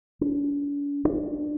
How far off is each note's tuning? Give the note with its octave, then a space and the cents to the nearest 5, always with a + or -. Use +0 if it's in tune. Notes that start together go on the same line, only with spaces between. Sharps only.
D4 -45
D4 +15